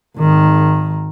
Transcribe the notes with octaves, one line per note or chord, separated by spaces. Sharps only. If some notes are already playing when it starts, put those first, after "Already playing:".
G#1 D#3